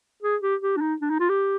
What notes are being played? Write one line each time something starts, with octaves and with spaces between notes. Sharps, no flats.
G#4
G4
G4
D4
D#4
D4
D#4
F4
G4